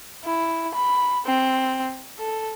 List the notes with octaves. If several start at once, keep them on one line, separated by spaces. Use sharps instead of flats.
E4
B5
C4
A4